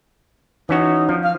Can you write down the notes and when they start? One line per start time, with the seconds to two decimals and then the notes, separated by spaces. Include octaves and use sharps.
0.69 E3 C#4 D#4 F#4
1.09 F3
1.22 F5